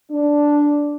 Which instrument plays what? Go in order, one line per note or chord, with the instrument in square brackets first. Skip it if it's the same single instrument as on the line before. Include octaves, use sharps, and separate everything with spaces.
[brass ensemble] D4